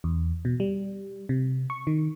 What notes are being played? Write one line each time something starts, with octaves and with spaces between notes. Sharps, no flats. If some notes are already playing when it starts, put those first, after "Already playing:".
E2
B2
G3
C3
C#6
D#3